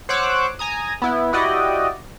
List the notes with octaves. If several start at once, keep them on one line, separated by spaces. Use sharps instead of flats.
C5 C#5 F#5 D6 E6 F#6
G#5 A#5 D#6
B3 E4
E4 F#4 G4 D5 D#5